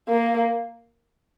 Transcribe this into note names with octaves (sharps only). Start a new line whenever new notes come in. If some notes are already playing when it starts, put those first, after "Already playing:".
A#3